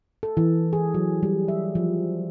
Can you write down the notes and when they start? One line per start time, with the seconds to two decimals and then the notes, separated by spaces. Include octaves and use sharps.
0.23 A4
0.37 E3
0.73 G#4
0.94 F#3
1.23 G3
1.48 E5
1.75 F3